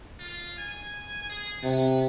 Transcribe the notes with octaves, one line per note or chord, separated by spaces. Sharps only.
F4
G#5
G#4
C3 B3